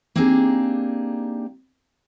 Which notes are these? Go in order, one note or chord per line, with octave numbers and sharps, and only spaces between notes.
A#3 C4 D4 D#4 G4 G#4